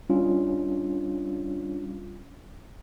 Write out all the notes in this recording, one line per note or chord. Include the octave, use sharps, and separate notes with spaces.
G3 C#4 D4 F4